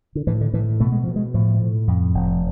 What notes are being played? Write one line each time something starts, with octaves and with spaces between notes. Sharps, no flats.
D3
A2 E3
D3
A2 E3
B2 A3
G#3
B2 F3
G#3
A2 F3
A2
F2
F1